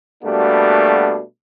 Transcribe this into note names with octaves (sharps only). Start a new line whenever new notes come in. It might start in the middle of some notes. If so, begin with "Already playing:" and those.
B2 G3 A3 A#3 D4 F#4